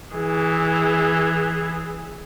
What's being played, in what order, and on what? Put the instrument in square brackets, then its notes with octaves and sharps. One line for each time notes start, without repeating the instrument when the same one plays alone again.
[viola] E3 G#4